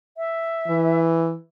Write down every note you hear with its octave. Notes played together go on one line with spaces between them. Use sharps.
E5
E3